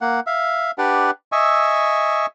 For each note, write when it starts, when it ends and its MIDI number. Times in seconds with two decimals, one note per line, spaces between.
0.01 0.20 58
0.01 0.20 78
0.27 0.71 76
0.27 0.71 77
0.78 1.11 62
0.78 1.11 67
0.78 1.11 71
0.78 1.11 74
0.78 1.11 78
1.32 2.26 75
1.32 2.26 76
1.32 2.26 80
1.32 2.26 85
1.32 2.26 88